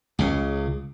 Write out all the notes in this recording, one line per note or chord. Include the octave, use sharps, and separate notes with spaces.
C#2 C#3